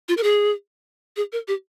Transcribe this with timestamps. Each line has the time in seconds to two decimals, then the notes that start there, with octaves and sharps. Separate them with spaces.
0.09 F4
0.17 A#4
0.23 G#4
1.17 G#4
1.32 A#4
1.48 G4